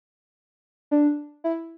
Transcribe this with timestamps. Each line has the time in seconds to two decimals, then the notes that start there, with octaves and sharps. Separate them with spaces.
0.91 D4
1.44 E4